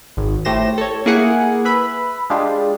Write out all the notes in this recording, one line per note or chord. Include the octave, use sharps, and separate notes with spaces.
G#1
A2 A3 G4 C5 A#6 E7
A4 C#5
A#3 E4 G#4 F#5 G#5
B4 E5 B5
G#3 D4 F4 G4